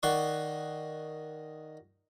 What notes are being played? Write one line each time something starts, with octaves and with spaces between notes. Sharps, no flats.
D#3 D5 F#5 C6 C#6